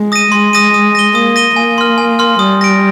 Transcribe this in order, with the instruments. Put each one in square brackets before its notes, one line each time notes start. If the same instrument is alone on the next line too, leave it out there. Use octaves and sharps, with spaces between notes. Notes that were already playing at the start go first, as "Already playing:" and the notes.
Already playing: [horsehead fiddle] G#3
[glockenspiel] D#6 A#6 D#7
[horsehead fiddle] G#3 [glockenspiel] C6
[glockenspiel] D#6 A#6 D#7
D#6
A#6 D#7 G7
[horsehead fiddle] A#3 [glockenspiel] D#6
[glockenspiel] A#6 D#7 G7
[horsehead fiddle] A#3 [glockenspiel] G#5
[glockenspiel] C6 F6
G#5
C6 F6
[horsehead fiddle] G3 [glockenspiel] D#6
[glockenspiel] A#6 D7